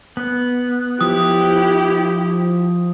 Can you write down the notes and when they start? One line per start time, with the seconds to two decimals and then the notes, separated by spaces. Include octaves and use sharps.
0.17 B3
1.01 F3 E4 G4 D#6